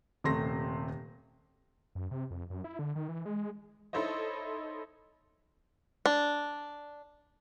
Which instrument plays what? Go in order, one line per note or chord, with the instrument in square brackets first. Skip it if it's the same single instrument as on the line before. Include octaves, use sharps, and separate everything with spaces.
[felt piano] D#1 C3 A3 C6 A#6
[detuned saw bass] F#2
C3
F2
F#2
E4
D3
D#3
E3
G#3
[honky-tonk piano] D#4 E4 A4 C5 C#5 D#5
[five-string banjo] D4